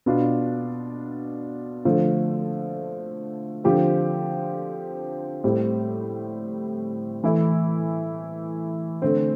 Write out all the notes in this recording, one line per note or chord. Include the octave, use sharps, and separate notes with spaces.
B2 B3 D4 F4
D3 F3 A3
D3 F3 C4 G4
A2 G3 C4
E3 A3 E4
D3 A3 C4